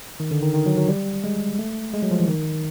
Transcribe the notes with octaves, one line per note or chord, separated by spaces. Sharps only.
D#3
D3
D#3
D#3
F#3
F#3
G3
G#3
A3
G#3
F#3
F3
E3
D#3